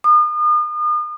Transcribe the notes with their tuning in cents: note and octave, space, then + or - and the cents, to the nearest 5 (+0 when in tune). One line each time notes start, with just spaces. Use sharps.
D#6 -40